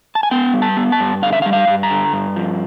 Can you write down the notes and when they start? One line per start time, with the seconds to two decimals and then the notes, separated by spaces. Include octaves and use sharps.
0.15 A5
0.23 G#5
0.31 B3 G5
0.53 G3
0.62 A5
0.77 B3
0.92 A5
1.00 G2
1.22 D3 F5
1.33 E5
1.42 F5
1.46 G3
1.53 F5
1.67 G2
1.83 A#5
1.91 D3
2.13 G2
2.36 F3